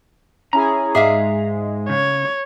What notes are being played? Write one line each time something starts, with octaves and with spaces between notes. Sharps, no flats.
C#4 E4 G#4 A#5
G#2 G#3 G#4 E5 F5
C#3 C#5